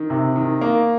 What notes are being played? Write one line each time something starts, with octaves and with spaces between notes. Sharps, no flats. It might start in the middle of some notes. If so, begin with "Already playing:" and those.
Already playing: D#3
C3
D#3
A#3